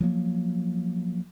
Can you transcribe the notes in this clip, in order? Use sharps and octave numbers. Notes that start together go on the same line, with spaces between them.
F3 F#3 A#3